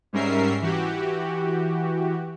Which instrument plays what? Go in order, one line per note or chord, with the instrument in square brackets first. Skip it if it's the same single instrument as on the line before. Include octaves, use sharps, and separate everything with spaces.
[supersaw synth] G#2 G3 C#4 A#4 E5 C7
E3 F#4 G4